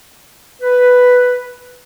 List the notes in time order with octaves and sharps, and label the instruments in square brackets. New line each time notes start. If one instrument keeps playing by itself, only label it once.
[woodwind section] B4